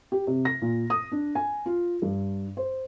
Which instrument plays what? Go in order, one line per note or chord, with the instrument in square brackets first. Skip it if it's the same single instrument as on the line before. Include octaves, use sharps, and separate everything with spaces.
[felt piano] G4
C3
A#6
A#2
D#6
D4
G#5
F4
G2
C5